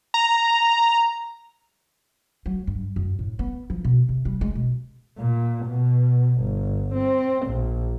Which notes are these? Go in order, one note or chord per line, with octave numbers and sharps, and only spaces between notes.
A#5
F#3
G2
F#2
A2
B3
F3
B2
C3
G3
G#3
B2
A#2
B2
G1
C4
A#1